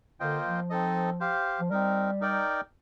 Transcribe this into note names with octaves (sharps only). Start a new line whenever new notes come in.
D3 A#3 F4 C5 D#5 G5
F3
C4 D#4 A4 D#5
G4 C5 F5
F3
G3 C4 D#4 A#4
D#4 A#4 D5 G5